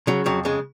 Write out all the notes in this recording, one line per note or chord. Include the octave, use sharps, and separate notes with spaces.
C#3 F#3
F2 F#3
C#3 G#3